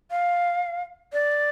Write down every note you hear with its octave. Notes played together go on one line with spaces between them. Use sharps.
F5
D5